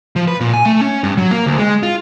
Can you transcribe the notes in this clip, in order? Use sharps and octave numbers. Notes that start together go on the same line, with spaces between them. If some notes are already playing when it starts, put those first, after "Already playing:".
F3
B4
A#2
G#5
A3
C#4
G2
F#3
A#3
D2
G#3
F4